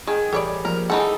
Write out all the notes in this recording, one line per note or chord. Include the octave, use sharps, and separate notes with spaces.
D#3 G#4 G5
A1 G3 A4 C#5 D5
F3 A#3 A#4
E3 D#4 G#4 A4 F#5